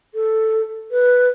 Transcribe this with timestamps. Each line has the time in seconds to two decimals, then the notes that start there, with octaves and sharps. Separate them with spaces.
0.15 A4
0.91 B4